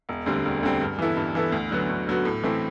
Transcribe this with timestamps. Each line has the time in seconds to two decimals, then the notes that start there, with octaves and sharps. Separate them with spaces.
0.09 E1
0.26 D2 D3 G3 C4
0.45 E1
0.63 D2 D3 G3 C4
0.81 G2
0.99 E3 B3 E4 A4
1.17 G2
1.35 E3 B3 E4 A4
1.52 D2
1.71 D3 F#3 B3 F#4
1.89 D2
2.07 D3 F#3 B3 F#4
2.25 A2
2.43 E3 A3 C4 E4